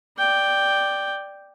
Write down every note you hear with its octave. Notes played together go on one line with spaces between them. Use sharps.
D5 G5